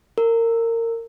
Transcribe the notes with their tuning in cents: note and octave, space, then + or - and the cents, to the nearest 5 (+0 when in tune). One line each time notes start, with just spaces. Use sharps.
A#4 -25